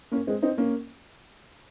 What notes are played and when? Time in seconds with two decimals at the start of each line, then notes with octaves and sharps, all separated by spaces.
0.11 A#3 C#4
0.27 G#3 C4
0.42 C4 D#4
0.58 A#3 C#4